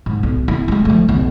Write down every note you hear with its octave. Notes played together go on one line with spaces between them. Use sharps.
G#2
B1
E4
G#3 A3
F3 A3
B1 E2